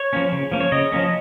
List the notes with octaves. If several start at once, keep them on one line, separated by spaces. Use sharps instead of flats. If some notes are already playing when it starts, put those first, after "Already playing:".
Already playing: C#5
F3 A#3 C#4
C#3
F3 A#3 C#4
C#5
C#3 D#5
F3 A#3 C#4